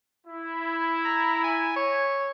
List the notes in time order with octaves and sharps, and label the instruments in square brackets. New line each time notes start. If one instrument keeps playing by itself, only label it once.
[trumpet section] E4
[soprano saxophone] A#5
G#5
C#5